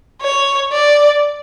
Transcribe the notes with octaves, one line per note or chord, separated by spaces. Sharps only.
C#5
D5